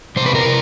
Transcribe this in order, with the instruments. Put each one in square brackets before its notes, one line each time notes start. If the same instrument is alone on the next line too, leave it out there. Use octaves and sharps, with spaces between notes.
[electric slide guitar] F2 C3 C5
B4
A#4
C3